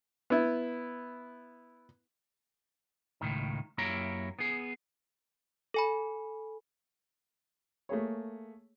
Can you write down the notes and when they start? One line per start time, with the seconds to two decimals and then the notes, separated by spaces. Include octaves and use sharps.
0.30 B3 E4
3.21 C#2 F#2 A2 D#3
3.78 F#2 A#3 E4 G4 C#5 A#5
4.39 B3 G#4
5.74 A4 G#5 B5
7.89 A3 A#3 G#4 C#5